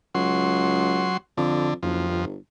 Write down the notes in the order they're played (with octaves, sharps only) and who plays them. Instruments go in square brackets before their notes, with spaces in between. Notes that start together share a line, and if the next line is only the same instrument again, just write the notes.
[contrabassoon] C#2 [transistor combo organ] F#3 C6
[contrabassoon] F2 [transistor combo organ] D3
[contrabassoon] F#1 [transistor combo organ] F2
[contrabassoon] G1